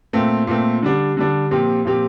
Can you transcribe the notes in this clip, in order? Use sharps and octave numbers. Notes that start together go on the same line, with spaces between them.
A#2 A3 C4
A#2 A3 C4
D3 G3 D4
D3 G3 D4
A#2 F3 C4 G4
A#2 F3 C4 G4